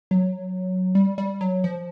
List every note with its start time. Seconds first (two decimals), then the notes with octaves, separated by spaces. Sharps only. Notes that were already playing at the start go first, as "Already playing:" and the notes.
0.11 F#3
0.95 G3
1.18 G3
1.41 F#3
1.64 F3